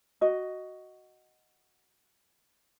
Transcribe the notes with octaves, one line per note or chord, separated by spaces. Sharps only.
F#4 D#5